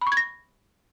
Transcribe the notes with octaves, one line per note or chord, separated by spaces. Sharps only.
B5
C#6
G#6
A#6